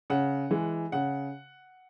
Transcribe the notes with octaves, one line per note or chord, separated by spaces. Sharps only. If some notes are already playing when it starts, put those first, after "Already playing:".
C#3 F#5
E3 G#3
C#3 F#5